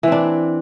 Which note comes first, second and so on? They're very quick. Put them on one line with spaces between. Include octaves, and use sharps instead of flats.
E3 C4 D4